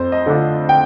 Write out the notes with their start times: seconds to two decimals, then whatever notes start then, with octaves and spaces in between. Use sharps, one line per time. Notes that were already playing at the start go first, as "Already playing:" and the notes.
Already playing: F2 C5
0.12 D#5
0.26 D3 A3 D4 F4
0.69 G5